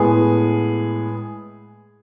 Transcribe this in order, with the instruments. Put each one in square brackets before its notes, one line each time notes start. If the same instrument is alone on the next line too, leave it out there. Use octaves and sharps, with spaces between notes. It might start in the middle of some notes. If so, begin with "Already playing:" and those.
Already playing: [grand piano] A2 G#3 B3 G#4